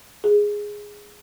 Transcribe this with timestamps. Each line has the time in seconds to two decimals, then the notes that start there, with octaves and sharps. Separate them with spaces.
0.24 G#4